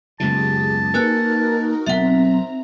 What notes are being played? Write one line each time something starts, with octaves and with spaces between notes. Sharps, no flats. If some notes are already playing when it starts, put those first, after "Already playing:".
F#1 C#2 B2 G4 G#4 A5
A#3 D#4 F#4 A#4 B4 G#5 F#6
B1 C4 E5 F#5 A#5